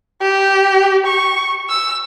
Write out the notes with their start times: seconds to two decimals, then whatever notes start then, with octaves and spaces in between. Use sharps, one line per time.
0.22 G4
1.06 C#6
1.69 E6